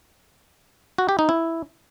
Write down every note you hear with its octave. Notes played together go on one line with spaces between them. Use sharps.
F#4
G4
D#4
E4